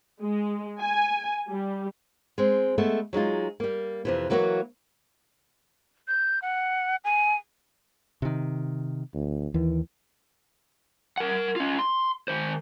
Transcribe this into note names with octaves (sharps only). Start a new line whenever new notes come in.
G#3
G#5
G3
G#3 C4
G#3 A3 B3 E5
F#3 G#3 D#4 F4
G3 A#3
F2 C3 E3
E3 F#3 A#3 E4 F#4
G6
F#5
G#5
C3 D#3
D2
D#2 E3
A#4 F#5
C#4 F4
C6
D#3 C5